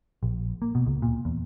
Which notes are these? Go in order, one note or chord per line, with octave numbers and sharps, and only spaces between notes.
A#1
A#3
B2
C#2
A#2
E2